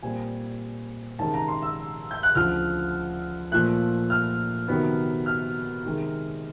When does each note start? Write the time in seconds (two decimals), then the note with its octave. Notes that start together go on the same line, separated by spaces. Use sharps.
0.03 A#2 G3 C4 G#5
1.19 C3 D#3 G#3 C#4 A5
1.34 A#5
1.48 C6
1.63 E6
2.11 G6
2.23 F#6
2.35 D2 C#3 F3 F6
3.51 A#2 F3 A3 F#6
4.10 F6
4.68 C3 D#3 F#3 B3
5.26 F6
5.85 C3 D#3 G#3